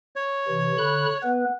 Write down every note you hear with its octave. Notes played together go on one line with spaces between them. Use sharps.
C#5
C3 E3
D3 B5 F#6
B3 B4